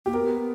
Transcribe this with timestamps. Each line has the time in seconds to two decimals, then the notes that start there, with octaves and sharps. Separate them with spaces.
0.06 A#3 G4
0.14 B3 A#4